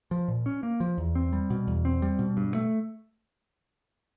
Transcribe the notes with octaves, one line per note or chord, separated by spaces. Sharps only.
F3
A#2
C#4
A#3
F3
E2
C4
G3
B2
E2
C4
G3
B2
G2
A3